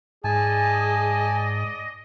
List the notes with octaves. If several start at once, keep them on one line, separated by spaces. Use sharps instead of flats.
G#2 G#4 D5 D#5 G#5 A5